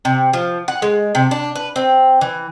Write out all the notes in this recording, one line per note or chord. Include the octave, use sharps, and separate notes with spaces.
C3
F3
F#5
G#3
C3
D4
B4
C4
E3